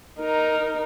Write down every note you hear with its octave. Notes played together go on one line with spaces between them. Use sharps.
D#4 A#4